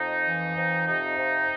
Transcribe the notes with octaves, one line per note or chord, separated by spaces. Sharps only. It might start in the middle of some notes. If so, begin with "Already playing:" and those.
Already playing: F2 D#4
E3
F2
C3 D#4
F2